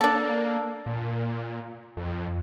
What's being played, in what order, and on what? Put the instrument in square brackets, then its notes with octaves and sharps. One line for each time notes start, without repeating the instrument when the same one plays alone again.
[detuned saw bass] A#3 [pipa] D4 A4
[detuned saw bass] A#2
F2